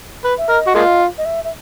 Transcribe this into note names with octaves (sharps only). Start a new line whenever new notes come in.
B4
E5
A#4 D#5
F#4
G#3 A#3 F4
D#5
E5
E5